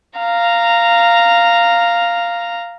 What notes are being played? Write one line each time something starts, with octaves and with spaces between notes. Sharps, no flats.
F5 A#5